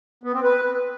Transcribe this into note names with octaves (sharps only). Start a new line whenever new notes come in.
B3
C4
B4